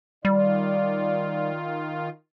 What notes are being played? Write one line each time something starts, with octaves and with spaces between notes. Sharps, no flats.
D#3 G3 F4 D5